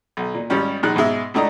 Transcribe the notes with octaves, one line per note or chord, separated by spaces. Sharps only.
B1
A#2
G#1 G3 C#4
A#1 G#3 D#4 F#6
G#2 B2 G#3 E5
C#2 A3 D4 D#5 A#5